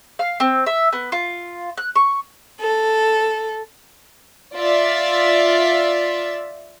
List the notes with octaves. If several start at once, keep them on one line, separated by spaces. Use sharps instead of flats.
F5
C4
E5
B3
F4
F#6
C#6
A4
F4 D5 E5